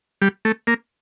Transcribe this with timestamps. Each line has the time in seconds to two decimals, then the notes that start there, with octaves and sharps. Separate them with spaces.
0.22 G3
0.45 A3
0.67 A#3